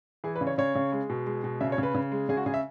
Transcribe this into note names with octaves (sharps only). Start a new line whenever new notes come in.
E3 G#4
B4
C#3
C#5
C#3 C#5
C#3
G#3
B2
G#3
B2
C#3 E5
C#5
C#3 B4
C#3
G#3
C#3 G#4
F#4
C#3 G#4
E5